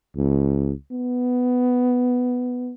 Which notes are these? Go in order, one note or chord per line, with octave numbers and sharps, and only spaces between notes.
C#2
B3